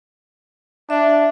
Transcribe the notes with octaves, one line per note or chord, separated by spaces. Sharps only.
D4 E5